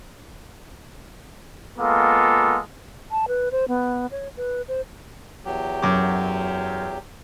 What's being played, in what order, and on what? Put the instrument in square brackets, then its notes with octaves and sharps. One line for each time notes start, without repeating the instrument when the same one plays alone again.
[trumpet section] G#3 A#3 B3 F4 A4
[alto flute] A5
B4
C5
B3
C#5
B4
C5
[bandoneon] E2 F#3 G4
[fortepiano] F#2 D6